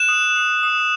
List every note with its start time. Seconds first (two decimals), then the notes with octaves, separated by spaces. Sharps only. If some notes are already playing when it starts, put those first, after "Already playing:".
Already playing: F#6 E7
0.09 D#6
0.36 D#6
0.63 D#6